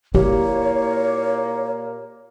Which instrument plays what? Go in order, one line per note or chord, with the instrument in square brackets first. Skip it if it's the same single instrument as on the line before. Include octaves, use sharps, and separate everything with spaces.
[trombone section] A#2 A#3 [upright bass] E4 [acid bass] G4 [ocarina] C#5